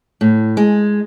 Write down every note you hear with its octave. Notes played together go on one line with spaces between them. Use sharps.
A2
G#3